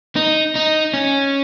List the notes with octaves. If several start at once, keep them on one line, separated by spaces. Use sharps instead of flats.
D#4
D#4
C#4